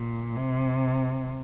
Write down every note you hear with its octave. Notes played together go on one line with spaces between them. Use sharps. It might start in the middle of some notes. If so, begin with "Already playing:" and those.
Already playing: A#2
C3